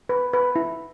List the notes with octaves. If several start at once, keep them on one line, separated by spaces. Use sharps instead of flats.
B4
B4
E4